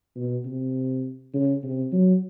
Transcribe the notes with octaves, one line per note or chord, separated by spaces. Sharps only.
B2
C3
C#3
C3
F#3